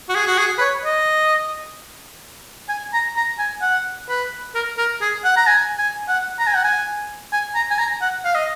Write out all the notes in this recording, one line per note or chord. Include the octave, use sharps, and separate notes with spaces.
F#4
G#4
F#4
G#4
B4
C#5
D#5
G#5
A#5
A#5
G#5
F#5
B4
A#4
A#4
G#4
F#5
A#5
G#5
G#5
F#5
A#5
G#5
F#5
G#5
G#5
A#5
G#5
A#5
F#5
F5
D#5